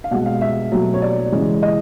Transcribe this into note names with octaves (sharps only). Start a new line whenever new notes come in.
F5
B2 G#3 F#5
F5
E5
B2 F#3 A3
C#5
D5
C#3 E3 G#3
D#5